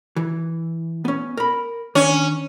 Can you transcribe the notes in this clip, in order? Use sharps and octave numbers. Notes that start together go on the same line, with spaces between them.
E3
B3 C#4
A#4 B5
D#3 C#4 D4